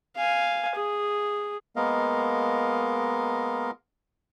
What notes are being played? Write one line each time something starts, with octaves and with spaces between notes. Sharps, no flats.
F5 G#5
G#4
G#3 A#3 B3 A#4 D#5 F5